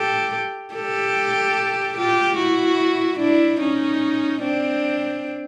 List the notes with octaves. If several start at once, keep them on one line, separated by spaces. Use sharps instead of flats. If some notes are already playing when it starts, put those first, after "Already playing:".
Already playing: G4 A4
G4 A4
F4 G4
E4 F#4
D4 E4
C#4 D#4
C4 D4